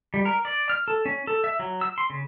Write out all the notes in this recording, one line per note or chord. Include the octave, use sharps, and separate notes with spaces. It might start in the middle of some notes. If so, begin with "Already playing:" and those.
G3
A#4
D5
F6
A4
C#4
A4
E5
F#3
E6
C6
C#3